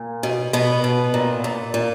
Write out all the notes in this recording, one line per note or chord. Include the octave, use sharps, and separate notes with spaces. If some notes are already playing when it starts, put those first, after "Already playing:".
Already playing: A#2
B2
B2 B3
B2
A#2
A#2
A#2